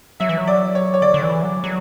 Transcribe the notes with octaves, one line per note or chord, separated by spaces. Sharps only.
F#3 E5
E3
F#3
D5
C#5
C#5
D3 D5
D3
E3
F#3
F#3